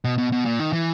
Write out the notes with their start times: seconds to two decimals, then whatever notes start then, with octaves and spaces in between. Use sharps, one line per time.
0.04 B2
0.18 B2
0.32 B2
0.46 A#2
0.59 D#3
0.73 E3